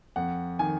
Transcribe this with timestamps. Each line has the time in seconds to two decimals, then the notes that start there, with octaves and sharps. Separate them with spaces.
0.16 F2 F#5
0.59 D#3 G#5